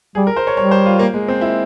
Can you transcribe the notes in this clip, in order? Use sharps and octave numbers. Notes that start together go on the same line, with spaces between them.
G3 G#4
A#4
C5
C#5
G3 C#5
C5
F4
A#3
G#3
C4
E4